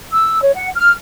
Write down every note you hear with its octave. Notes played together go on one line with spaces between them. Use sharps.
E6
C#5
F#5
F6